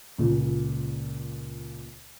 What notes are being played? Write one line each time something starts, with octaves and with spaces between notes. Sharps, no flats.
C#2 A#2